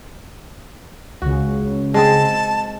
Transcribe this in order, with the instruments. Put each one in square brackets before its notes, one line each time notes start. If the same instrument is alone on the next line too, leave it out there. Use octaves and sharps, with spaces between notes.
[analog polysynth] C#2 C#3 [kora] F#4
[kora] G#3 C4 G#4 [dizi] A5